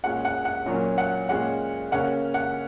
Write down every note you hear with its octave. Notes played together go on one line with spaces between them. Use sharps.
A#2 G#3 C#4 F#5
F#5
F#5
A#2 F#3 A#3 C#4
F#5
A#2 G#3 C#4 F#5
C#3 A#3 C#4 F#5
F#5